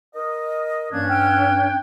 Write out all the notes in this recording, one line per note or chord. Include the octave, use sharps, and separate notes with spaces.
A#4 D#5
G2 E3 A#3 C#4 D4 F#6 G#6
F#5 G5 E6 F6